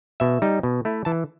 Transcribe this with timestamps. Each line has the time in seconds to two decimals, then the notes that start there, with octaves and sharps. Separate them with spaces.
0.20 B2 E5
0.42 G3 D#4
0.63 B2
0.85 A3 E4
1.05 E3 A5